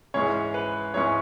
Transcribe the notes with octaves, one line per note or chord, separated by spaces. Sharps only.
G#2 E3 G#3 C#4 C#5
B4
G#2 E3 G#3 C#4 C#5